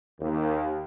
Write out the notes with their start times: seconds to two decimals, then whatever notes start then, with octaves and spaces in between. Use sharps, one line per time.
0.18 D#2